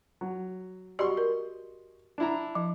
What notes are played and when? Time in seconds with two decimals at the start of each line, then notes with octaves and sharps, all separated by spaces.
0.21 F#3
0.99 F#4 G4 D5 D#5 C6 C#6
1.17 A#4
2.18 D4 E4 A#5
2.55 F3